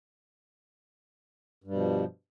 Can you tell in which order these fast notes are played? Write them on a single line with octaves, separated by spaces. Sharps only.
G2 G3 B2 F3